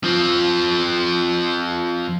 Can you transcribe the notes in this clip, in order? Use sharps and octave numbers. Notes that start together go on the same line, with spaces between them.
F3 C4